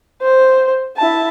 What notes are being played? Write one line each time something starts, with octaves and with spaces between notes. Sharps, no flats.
C5
E4 A5